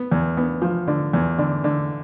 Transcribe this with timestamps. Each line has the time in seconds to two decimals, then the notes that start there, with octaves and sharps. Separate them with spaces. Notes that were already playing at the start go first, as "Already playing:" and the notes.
Already playing: B3
0.11 E2
0.37 B3
0.62 F3
0.88 D3
1.13 E2
1.38 D3
1.64 D3